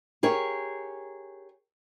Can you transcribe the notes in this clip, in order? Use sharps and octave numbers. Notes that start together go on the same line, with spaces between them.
G4 G#4 A#4 C#5